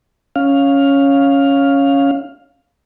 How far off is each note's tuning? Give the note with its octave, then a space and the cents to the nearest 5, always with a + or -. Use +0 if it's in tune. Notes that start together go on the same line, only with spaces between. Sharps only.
C#4 +0 F5 +5